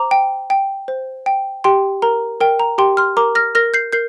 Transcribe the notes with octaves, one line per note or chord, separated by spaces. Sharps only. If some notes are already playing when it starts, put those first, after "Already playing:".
Already playing: C5 A#5 D6
G5
G5
C5
G5
G4 G5 C6
A#4 A#5
A#4 G5
A#5
G4 G5 C6
C6 F6
A#4 A#5 D6
F6 A#6
A#4 F6 A#6
G6 C7
A#4 G6 C7